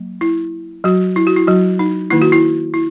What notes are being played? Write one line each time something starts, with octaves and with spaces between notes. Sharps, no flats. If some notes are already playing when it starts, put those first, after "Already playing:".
Already playing: F#3 A#3
E4
F#3 F#4
E4
F#4
E4
F#3 F#4
D#4
D#3 A#3 D#4 E4
F#4
E4
E4